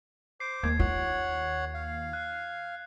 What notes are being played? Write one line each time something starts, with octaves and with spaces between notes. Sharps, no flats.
C5 D6 C7
D#2 A#3 G#6
F4 C#5 F#5
F5
F#6